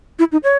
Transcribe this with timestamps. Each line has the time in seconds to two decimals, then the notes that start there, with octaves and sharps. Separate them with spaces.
0.19 E4
0.32 D#4
0.44 C#5